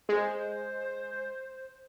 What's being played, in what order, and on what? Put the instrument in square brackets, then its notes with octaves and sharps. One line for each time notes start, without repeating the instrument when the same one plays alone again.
[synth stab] G#3 [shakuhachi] C5